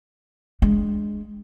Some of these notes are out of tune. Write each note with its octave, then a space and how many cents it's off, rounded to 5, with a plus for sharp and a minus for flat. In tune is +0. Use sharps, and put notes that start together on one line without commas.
G#3 +0 D4 -15